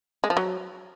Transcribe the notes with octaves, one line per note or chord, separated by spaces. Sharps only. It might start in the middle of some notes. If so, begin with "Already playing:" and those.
G#3
F3
F#3